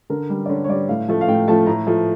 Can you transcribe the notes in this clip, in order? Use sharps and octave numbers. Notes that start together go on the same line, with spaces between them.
D3 A#4
G3
D5
D3 C#5
C#5
G3 D5
A2 F5
F3 A3
F5
A2 G5
F3 A3 A5
A2 A#5
F3 A3